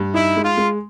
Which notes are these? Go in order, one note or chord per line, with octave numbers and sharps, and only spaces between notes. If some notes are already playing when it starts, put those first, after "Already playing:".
Already playing: G2
D#4 E4
G#3
F4
G#3